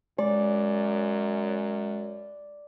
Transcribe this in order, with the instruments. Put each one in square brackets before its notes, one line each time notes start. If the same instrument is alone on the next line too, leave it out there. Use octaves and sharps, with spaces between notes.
[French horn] F#2 [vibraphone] G#3 [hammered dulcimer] D5